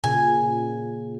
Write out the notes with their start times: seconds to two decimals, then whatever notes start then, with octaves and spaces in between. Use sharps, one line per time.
0.04 A#2 C#3 G#5